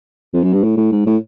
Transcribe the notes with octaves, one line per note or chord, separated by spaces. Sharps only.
F2
F#2
G2
A2
A2
G#2
A2